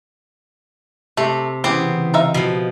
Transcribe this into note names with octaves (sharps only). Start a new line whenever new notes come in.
C3 A3
C#3 E3 B3 C4 G4 G#4
D#4 E5 F5
B2 F3